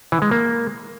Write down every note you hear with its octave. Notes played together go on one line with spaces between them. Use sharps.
E3
G#3
A#3